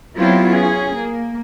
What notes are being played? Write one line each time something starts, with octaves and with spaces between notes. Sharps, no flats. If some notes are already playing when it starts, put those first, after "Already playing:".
F#3 B3 C4 E4 F4 G4
C#4 G#4
A#3